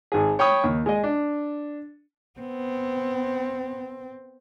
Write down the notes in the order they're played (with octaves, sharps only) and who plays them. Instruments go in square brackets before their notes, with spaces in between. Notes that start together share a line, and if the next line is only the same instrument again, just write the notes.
[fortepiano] G#1 G#4
C#5 G5 B5 C#6 D#6
D#2
G#3 D#5
D4
[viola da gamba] B3 [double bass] C4